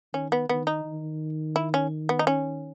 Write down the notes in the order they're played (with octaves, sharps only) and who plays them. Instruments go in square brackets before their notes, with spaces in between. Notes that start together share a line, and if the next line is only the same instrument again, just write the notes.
[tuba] D#3 [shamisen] C#4
[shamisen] B3
[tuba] D#3 [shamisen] B3
[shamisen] D#4
[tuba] D#3
[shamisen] E4
C#4
B3
D#4
C#4